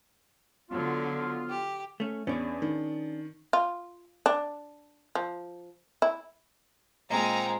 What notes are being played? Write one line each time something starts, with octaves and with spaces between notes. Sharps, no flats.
D3 F3 F#3 B3 F4
G4
A3 C#4
E2 C#4 D4 G#4
D#3
F4
D4
F3
E4
A#2 G#3 C4 F4 D#5 G5 A#5